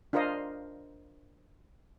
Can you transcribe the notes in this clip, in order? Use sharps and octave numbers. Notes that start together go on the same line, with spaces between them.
D4 F4 A#4 C5 D#5 F5